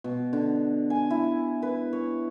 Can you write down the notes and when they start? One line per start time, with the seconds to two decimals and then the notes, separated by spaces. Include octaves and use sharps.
0.04 B2
0.33 D3
0.90 G#5
1.10 E4
1.62 B4
1.93 C#5